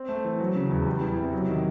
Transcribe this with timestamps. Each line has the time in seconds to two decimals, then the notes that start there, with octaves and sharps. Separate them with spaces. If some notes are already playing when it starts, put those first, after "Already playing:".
Already playing: C4
0.09 A3
0.24 E3
0.40 F#3
0.55 C#3
0.71 E2
0.87 G3
1.02 E3
1.17 C3
1.33 F#3
1.49 D#3